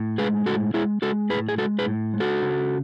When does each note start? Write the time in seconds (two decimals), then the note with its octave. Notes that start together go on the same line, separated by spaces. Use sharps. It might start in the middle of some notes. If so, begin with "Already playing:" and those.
Already playing: A2
0.18 G#3 G#4 B4
0.46 A2 F#4 A4
0.74 G#3 E4 G#4
1.02 G#3 F#4 A4
1.30 A2 G#4 B4
1.49 G#4
1.58 G#3 F#4 A4
1.79 G#4 B4
1.86 A2
2.14 G#3
2.20 F#4 A4
2.42 C#3